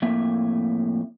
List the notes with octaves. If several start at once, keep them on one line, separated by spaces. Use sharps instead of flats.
F2 A2 A#3 E5